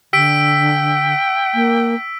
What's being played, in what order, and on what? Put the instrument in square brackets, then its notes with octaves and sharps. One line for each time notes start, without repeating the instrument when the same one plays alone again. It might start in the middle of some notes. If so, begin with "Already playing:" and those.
[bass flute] D3 [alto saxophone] G5 [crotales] E6 B6 D7
[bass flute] A#3